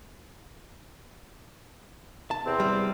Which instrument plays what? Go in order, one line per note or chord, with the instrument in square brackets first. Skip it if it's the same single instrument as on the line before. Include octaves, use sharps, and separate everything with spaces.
[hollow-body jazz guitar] A5
[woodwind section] E2 C3 C4
[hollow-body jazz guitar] G3